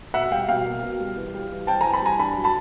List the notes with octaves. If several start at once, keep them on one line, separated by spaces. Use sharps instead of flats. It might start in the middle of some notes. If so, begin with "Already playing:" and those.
B2 E5 F#5
G3 F5 G5
B2 F5 G5
A#3
B2
G3
E3
G3
E3
C4 G5 A5
E3 G#5 A#5
A5 B5
G3 G#5 A#5
D4 A5 B5
F#3
A5 B5